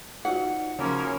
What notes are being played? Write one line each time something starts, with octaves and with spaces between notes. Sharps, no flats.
D#4 F4 F#4 F#5
C#3 F3 A#3 C#4